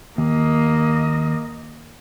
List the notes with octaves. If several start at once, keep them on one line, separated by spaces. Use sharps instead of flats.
D#2 A#3 D#5